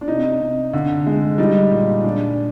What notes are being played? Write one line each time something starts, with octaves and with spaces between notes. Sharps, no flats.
D4
C3 D#4
C3
D3
G#3
G3 D#4
A#2
F3 D4